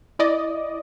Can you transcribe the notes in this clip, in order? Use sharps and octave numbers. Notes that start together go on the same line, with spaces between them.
E4 D5 D#5